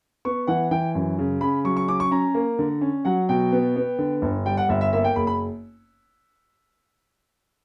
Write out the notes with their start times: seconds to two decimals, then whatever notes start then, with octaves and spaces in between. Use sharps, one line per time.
0.25 B3 C#6
0.47 E3 F#5
0.71 E3 G5
0.95 F#2
1.19 C#3
1.41 C#3 B5
1.65 F#3 C#6
1.77 C#6
1.88 C#4 D6
2.00 C#6
2.11 C#4 A#5
2.34 A#3
2.59 D3
2.81 C#4
3.05 F#3 F#5
3.29 B2 G5
3.52 B3
3.76 B3
3.99 D3
4.22 G1
4.46 G3 G5
4.57 F#5
4.69 G1 E5
4.81 E5
4.93 A#3 E5
5.04 G5
5.16 F#1 B5
5.27 B5